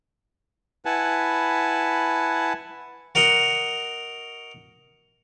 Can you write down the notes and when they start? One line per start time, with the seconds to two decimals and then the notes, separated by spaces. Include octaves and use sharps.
0.85 E4 B4 F#5 G#5 A5
3.15 F#4 A#4 D#5 F#5